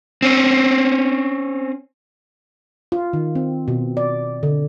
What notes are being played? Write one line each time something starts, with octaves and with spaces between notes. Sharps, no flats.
C4 C#4
F4
D#3
C4
B2
D5
D3